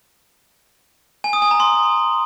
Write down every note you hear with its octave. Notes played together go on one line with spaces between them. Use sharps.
G#5
D#6
G#5
A#5
C6